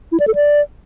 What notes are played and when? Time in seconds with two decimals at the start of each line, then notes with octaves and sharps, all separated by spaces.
0.12 E4
0.20 D5
0.27 A4
0.35 D5